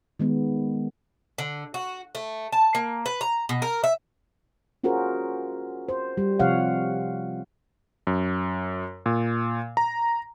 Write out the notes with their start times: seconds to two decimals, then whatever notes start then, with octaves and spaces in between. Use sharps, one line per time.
0.19 D#3 G#3 B3
1.38 D3
1.74 F#4
2.15 A3
2.52 A5
2.75 A#3
3.06 B4
3.21 A#5
3.49 B2
3.62 A#4
3.84 E5
4.84 C#4 F4 F#4 G#4 A#4 C5
5.89 C5
6.17 G3
6.39 C3 F3 C#5 F5 F#5
8.07 F#2
9.06 A#2
9.77 A#5